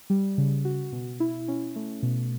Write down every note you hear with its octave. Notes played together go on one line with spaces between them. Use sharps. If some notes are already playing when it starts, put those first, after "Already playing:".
G3
C#3
F#4
B2
E4
C#4
A3
B2